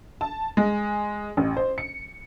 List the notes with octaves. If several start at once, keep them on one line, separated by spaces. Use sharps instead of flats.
A5
G#3
A1
C5
C#7